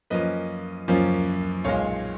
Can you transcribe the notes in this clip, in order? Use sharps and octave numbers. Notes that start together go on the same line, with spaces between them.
F#2 F3 A#3 C#4 B4 D#5
F#2 F3 A#3 C#4
B1 A#2 G#3 C#5 F5